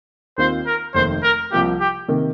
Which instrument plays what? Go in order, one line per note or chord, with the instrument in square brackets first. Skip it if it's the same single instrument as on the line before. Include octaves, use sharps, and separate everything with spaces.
[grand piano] D#2 D#3 C4 F4 [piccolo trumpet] C5
[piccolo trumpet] A#4
[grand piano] F1 D#2 D#3 [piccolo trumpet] C5
[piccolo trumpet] A#4
[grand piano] C2 C3 F3 A#3 F4 [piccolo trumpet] G4
[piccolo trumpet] G4
[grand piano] C3 D#3 A#3